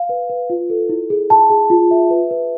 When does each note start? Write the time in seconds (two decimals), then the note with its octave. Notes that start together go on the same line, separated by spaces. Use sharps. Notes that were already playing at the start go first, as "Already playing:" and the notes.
Already playing: F5
0.09 B4
0.30 B4
0.50 F4
0.70 A4
0.89 E4
1.10 G#4
1.30 A5
1.50 G#4
1.70 F4
1.91 E5
2.10 B4
2.31 B4